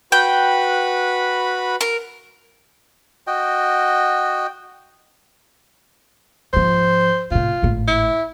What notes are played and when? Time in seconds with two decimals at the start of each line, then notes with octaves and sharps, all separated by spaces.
0.12 F#4 B4 G5 B5
1.81 A#4
3.27 F#4 D#5 G5
6.53 G#2 F3 C5
7.31 A2 C3 F4
7.62 G#1 A2
7.87 E4